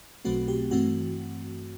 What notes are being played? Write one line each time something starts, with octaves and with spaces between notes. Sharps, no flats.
B1 B2 F#3 A3 C4 F#4
G4
G2 E3 A3 C4 F#4